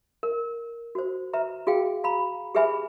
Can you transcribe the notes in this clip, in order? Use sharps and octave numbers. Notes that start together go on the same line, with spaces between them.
A#4
F#4 C5
B4 E5 A#5
F#4 G#4 F5 G5
F5 A#5 B5
G4 G#4 B4 E5 G#5 B5